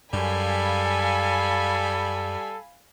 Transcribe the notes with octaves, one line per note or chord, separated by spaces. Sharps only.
F#2 G3 A4 F5 G#5 B5